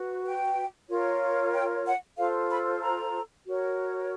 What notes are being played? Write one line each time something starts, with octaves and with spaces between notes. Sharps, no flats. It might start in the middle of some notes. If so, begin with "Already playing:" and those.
Already playing: F#4 B4
G5
F4 A#4 C#5
G5
F#5
F4 A4 C5 F5
B5
A#5
F#4 A#4 C#5